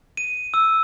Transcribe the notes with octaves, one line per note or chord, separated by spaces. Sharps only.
D#7
E6